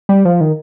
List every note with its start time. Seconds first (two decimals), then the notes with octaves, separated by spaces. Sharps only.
0.09 G3
0.25 F3
0.41 D#3